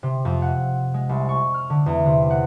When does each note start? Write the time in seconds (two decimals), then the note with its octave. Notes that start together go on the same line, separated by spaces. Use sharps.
0.03 C3
0.25 F2
0.42 F#5
0.94 G#3
1.09 C2
1.29 C#6
1.54 F6
1.70 D3
1.86 E2
2.06 C3
2.31 F#5